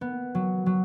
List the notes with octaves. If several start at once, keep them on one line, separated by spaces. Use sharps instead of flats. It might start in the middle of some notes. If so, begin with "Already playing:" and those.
B3
F#3
F#3